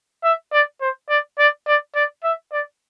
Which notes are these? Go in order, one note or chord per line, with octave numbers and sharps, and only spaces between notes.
E5
D5
C5
D5
D5
D5
D5
E5
D5